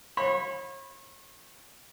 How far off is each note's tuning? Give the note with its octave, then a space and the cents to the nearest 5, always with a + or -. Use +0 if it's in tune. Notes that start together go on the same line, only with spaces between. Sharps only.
C#5 -40 B5 +0